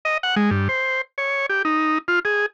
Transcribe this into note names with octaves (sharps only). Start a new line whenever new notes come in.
D#5
F#5
G#3
G2
C5
C#5
G4
D#4
F4
G#4